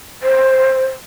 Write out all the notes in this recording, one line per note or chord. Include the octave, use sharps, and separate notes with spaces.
C5